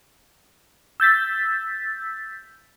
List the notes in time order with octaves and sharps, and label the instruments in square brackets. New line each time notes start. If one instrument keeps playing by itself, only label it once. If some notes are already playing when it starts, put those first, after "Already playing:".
[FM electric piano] E6 G6 A6 B6